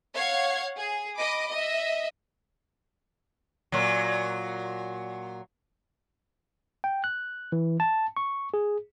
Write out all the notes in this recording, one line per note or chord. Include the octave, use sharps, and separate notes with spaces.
C#5 F5 F#5 G#6
G#4
D#5 B5 D6
D#5 E5
A#2 F#3
G5
F#6
E3
A5
C#6
G#4